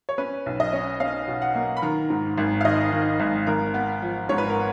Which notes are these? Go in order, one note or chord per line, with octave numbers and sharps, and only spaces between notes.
C#5
C#4 B4
B1
D#5
C#4
C#4 F5
B2
F#5
A#3
B5
D#3 A#5
G#2
G#1
F5
D#3 D#5
D#3
G#1
G#1 A#4
B3
F3
G#2 C#5
B4
A#4